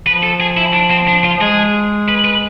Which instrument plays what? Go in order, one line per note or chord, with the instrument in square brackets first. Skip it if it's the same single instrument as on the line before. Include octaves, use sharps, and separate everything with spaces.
[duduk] F3 [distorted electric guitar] B4
[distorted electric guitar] A4
G#4
E4
D4
C4
D4
F4
[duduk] F3
[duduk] G#3 [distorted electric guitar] G#4
[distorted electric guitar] B4
B4